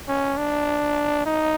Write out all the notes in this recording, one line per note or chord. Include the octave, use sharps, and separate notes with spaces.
C#4
D4
D#4